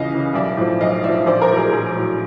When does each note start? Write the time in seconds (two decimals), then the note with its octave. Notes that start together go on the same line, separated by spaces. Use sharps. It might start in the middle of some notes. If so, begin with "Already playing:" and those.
Already playing: C#2 C#3 E3 D#5 F5
0.12 C#3 E3
0.34 B1 D5 E5
0.57 A2 F3
0.81 B1 D#5 F5
1.04 A2 F3 D5 E5
1.26 A#1 C5 D5
1.41 A#4 C5
1.50 A2 F#3
1.57 G#4 A#4
1.73 A#1
1.96 A2 F#3